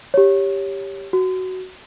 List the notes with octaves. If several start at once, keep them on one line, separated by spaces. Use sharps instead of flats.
G4 C#5
F#4